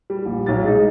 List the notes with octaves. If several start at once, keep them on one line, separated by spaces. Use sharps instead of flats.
G3
A#1
B1 A6
G#3 D#4